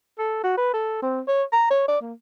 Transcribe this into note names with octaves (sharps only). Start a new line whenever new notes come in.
A4
F#4
B4
A4
C4
C#5
A#5
C#5
D5
A#3